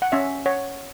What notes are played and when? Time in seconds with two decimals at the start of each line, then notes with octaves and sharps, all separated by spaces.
0.02 F#5
0.12 C#4 E5
0.46 C#5 F#5